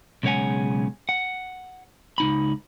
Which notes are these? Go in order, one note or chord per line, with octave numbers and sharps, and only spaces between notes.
B1 C#3 G#3 C#5 F#5 G#5
F#5
C#2 D#4 B5